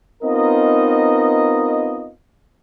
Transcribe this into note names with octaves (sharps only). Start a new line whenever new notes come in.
B3 C4 D#4 F4 A#4 D#5